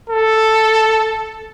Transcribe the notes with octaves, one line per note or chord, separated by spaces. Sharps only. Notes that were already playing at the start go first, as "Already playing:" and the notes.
A4